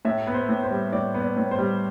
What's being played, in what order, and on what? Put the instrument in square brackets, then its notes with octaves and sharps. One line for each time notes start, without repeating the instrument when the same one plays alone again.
[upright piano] A2 E5
B3
C5
A2
C5
G3
A2 D5
B3
D5
A2
C5
G3